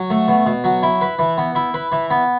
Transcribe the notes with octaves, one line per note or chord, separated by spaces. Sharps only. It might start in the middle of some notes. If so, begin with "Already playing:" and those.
Already playing: F#3
A3
B2
B2
F#3
E4
B4
E3
B3
E4
B4
E3
B3